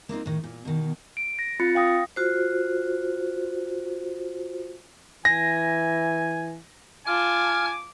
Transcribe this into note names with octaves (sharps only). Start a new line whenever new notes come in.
A#3 C4 D#4 F4
A2 D#3
A#2
B2 D#3
D7
A#6
C4 F4 B5 A6 C#7
F5 G5 D#6 A#6
F4 F#4 C5
E3 G#5 A#6
F4 G#5 A5 D6 F6